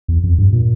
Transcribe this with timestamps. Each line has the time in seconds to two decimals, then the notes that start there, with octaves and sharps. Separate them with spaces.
0.08 E2
0.24 F2
0.38 G2
0.53 A#2